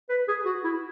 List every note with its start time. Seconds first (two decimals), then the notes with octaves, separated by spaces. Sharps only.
0.09 B4
0.28 G#4
0.45 F#4
0.64 E4